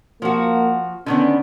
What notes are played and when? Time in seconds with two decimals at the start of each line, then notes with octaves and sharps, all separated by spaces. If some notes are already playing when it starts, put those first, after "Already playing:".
0.22 F3 A#3 F#4
1.06 D3 D#3 B3 C#4